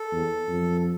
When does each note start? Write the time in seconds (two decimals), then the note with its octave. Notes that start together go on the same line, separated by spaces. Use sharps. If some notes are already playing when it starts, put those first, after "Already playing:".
Already playing: A4
0.12 E2
0.48 F2